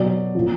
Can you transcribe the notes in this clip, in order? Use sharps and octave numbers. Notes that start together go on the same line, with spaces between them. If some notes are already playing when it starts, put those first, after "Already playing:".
Already playing: B2 F#3 D5
A#2 F3